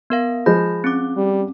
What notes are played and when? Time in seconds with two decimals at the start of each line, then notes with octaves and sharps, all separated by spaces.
0.10 B3 A#4 F5
0.46 F3 G#3 B5 G6 A#6
0.84 C4 C#4 D6
1.17 G3